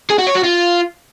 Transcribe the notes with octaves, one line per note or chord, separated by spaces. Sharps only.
G#4
F#4
C#5
F#4
F4